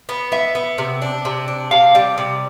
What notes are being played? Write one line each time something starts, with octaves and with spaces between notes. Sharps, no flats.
B3
B3 E5
B3
C3
D4
C3
D4
C3 F5
G3
C3